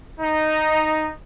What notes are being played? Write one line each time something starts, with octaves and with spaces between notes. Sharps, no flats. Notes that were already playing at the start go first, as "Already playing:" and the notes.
D#4